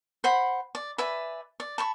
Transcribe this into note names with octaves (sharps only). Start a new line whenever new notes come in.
C5 F#5 B5
D5
B4 D5 E5 G#5
D5
A5 B5 C#6